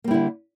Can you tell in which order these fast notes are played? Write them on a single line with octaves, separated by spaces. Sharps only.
A#3 G3 E4 D3